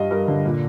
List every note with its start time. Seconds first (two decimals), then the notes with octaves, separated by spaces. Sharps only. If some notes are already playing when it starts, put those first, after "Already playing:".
Already playing: G2 G3 D#5 F5
0.11 G2 A#4
0.28 D3
0.45 A#2